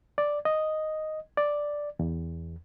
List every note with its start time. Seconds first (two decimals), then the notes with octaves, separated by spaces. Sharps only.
0.18 D5
0.45 D#5
1.37 D5
1.99 E2